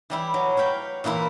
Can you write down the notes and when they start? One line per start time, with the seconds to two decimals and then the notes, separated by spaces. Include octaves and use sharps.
0.10 E3 G3 E4
0.34 F#3
0.57 C#5 F5 G5 B5
1.04 A#2 E3 A#3 E4